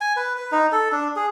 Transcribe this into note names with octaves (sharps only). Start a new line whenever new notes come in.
G#5
B4
B4
D#4
A4
D4
G#4